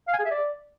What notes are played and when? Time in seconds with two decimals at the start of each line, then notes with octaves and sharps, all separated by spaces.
0.08 F5
0.13 G#5
0.19 G#4
0.25 E5
0.31 D5